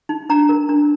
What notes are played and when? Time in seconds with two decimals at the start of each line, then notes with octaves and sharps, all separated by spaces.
0.09 D#4
0.30 D4 A#5
0.49 A#4
0.69 D4